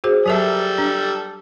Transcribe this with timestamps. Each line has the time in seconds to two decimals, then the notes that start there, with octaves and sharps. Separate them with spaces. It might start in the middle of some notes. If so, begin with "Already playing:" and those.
0.04 F#4 G#4 C5
0.26 F#3 G3 A4 A#4 E5
0.78 D4